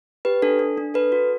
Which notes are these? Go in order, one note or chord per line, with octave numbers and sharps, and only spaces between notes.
G4 B4
D4 A4
D4
D4
A4 B4
F#4